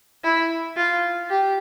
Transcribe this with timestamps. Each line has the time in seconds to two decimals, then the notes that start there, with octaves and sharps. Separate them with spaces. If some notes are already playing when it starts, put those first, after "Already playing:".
0.24 E4
0.77 F4
1.30 G4